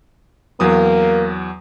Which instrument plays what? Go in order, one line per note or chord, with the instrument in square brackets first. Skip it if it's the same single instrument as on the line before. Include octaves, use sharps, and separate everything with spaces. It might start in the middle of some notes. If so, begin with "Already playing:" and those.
[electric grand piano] E2 F#3 D#6 [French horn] A#3